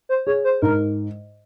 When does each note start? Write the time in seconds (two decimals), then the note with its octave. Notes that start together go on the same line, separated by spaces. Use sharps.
0.09 C5
0.26 G#4 C#5
0.44 C5
0.62 G#2 A#4